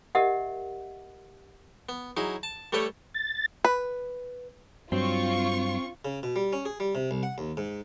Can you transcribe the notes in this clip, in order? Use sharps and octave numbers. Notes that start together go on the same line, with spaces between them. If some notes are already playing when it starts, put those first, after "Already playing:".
G4 A#4 D#5 E5 F#5
B3
F#3 D#4 E4 G#4
A5
G3 A3 A4 B4 C#5 G5
A6
B4
G2 F#3 C4 F4 C#6
C#3
B2
G3
C#4
G#4
G3
C3
C2
F#5
D#2
G#2